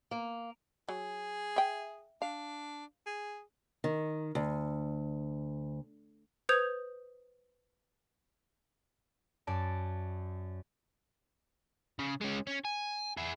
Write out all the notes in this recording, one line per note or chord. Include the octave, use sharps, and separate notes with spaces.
A#3
F#3 G#4
E5 G5
D4 F5
G#4
D#3
D2
B4 C5 D#6 G6 G#6 F7
F#2 D5 A5
C#3
G#3 C#4
C#4
G#5
E4 G#4